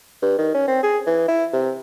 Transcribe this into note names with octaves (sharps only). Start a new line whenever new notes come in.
G2
D#3
C#4
C4
G#4
E3
E4
C3